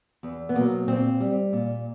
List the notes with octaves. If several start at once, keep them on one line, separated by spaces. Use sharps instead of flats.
E2
B3
B2 F#3 A#3
A#2 C4
G3
A#2